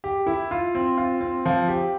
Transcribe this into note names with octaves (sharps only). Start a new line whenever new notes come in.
G4
E4
F4
C4
F4
C4
F3
G4